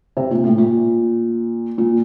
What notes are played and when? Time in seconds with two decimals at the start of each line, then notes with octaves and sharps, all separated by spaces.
0.17 C3
0.31 A#2
0.44 A2
0.58 A#2
1.78 A#2